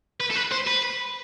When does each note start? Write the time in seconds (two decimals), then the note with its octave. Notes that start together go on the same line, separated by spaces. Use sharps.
0.20 B4
0.31 A4
0.36 B4
0.52 C5
0.67 B4